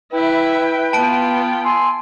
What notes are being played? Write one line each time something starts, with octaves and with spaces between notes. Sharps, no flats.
E4 B4 E5 G5
B3 F4 A5 D7
G#5 C6 E6